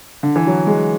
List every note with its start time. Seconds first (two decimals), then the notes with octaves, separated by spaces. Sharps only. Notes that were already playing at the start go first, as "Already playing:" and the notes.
0.23 D3
0.36 E3
0.47 F#3
0.67 G#3